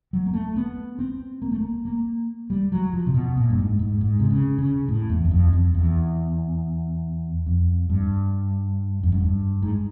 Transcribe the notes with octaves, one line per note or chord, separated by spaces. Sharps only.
F#3
A#3
A3
B3
C4
A#3
A3
A#3
A#3
G3
F#3
F3
C3
B2
A#2
G2
G#2
G#2
G#2
C3
C#3
C#3
A2
E2
E2
F2
F2
E2
F2
G2
F2
F#2
G2
G#2